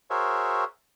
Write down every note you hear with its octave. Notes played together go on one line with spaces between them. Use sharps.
F#4 G#4 A#4 C5 C#5 E5